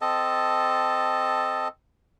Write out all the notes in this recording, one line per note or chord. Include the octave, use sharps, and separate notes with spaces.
C4 A4 D#5 A5